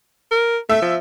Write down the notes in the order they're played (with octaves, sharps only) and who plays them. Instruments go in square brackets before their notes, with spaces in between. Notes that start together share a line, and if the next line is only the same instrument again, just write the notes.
[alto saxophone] A#4
[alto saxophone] A3 [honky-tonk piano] E5
[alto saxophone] F3